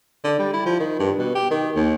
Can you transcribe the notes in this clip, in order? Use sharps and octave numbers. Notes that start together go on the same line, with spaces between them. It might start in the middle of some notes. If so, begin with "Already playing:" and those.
D3
G3
E4
F3
D#3
G2
B2
G4
D#3
D#2